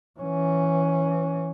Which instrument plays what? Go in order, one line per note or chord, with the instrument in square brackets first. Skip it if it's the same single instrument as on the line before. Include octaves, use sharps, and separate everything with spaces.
[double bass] E3 C#4